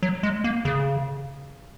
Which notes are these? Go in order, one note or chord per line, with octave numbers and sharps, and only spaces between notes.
F#3
G#3
A#3
C#3